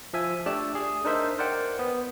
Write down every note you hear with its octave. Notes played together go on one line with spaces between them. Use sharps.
F3 E5 G#5
A3 D4 G4 A4 D5 A5
G#4
D4 D#4 A#4 C5 E5
A#4 C5 D5 F#5 G5
B3